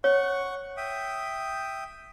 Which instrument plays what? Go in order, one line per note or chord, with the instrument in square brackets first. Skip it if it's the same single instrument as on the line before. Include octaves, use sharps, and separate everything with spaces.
[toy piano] C#5 [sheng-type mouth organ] F#5 C#6
[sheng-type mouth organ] E5 G5 D#6